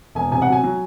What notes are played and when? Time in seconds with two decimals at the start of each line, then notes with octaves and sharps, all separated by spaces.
0.15 E1 G#5
0.31 C3 G#5
0.42 F#5
0.47 F#3
0.52 G#5
0.64 F#3